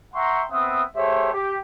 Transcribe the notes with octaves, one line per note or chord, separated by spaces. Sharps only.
E5 F#5 G5 A#5 C6 C#6
B3 C4 E5 F#5 D#6
A3 G4 G#4 C5 C#5 E5
G4